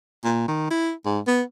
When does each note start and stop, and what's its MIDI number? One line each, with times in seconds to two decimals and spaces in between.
0.24 0.47 46
0.48 0.67 51
0.71 0.92 64
1.05 1.20 44
1.27 1.42 59